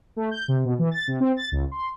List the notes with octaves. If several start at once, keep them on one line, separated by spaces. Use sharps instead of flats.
A3
G6
C3
B2
E3
A6
C3
C4
A6
C#2
C6